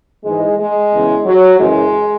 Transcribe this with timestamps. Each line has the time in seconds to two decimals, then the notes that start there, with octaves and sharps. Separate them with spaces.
0.25 G#2 E3 G#3
0.58 G#3
0.92 E2 C#3 E3
1.25 F#3
1.59 F#2 C#3 E3 G#3